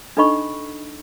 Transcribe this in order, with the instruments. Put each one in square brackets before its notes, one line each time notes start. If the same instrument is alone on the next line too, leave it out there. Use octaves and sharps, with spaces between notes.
[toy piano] D4 D#4 A4 D#5 B5 C#6